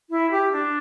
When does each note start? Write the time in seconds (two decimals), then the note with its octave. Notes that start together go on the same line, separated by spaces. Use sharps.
0.10 E4
0.31 G4
0.52 D4